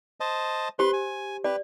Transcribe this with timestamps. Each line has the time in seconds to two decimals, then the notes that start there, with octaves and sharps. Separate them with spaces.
0.20 C5 D#5 A5
0.79 G4 B4 C5 C6
0.93 G#5
1.44 G4 B4 D5